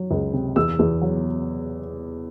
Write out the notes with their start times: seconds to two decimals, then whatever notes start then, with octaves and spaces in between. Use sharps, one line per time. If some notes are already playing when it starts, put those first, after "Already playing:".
Already playing: F#3
0.11 C#2
0.33 C3
0.56 E2 E6
0.79 E2
1.02 F#3